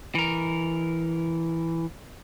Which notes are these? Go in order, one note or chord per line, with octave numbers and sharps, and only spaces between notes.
E3 A#4